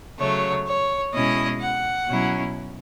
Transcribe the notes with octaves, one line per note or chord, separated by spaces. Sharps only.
C#3 F#3 A3 C#5
C#5
B2 G#3 C#4 E4 D#5
F#5
B2 F#3 C#4 E4